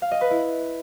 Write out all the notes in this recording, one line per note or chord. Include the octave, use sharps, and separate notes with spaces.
F5
D#5
B4
E4